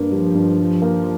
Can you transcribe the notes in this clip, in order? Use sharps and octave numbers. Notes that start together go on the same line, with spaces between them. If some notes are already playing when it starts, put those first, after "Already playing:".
Already playing: G2 A#3
F3 G3
G2
G3
A#3